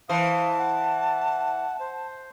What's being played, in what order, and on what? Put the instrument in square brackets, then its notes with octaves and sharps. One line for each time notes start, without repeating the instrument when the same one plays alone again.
[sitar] E3 C5 [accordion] F5 D#6 [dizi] A5
[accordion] F#5
C5